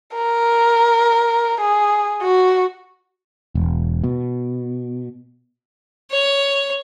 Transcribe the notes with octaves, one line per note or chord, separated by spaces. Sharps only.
A#4
G#4
F#4
E1
B2
C#5